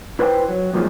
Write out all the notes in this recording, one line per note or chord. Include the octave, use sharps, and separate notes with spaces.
E4 B4 C5 F5 G5
F#3
F#2 A#2 D#3 F3 G3 G#3